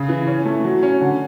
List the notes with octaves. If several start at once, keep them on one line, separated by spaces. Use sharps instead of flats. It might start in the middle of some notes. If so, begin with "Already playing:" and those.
Already playing: C#3
E3
C#4
A3
F#3
C#4
D3